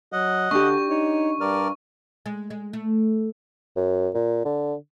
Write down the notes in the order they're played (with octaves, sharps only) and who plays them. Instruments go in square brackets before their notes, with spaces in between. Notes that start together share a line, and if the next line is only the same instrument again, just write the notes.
[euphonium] F#3 [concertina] D#5 F#5
[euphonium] D3 [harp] D4 G4 [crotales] C#6
[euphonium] D#4 [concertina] C#5
[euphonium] G2 [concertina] A#4 D5 F6
[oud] G#3
G#3
A3
[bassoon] F#2
A#2
D3